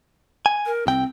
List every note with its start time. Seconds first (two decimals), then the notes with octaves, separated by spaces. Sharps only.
0.46 G#5
0.66 A#4
0.87 C2 C4 G5